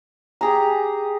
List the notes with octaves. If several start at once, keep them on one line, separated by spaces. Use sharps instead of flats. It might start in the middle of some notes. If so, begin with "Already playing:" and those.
G4 G#4 A#5